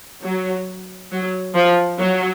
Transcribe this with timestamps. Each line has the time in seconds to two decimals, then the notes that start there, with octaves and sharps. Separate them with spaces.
0.23 F#3
1.11 F#3
1.55 F3
1.99 F#3